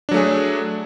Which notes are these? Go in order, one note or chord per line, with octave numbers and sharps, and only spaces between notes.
F#3 A3 D4 G#4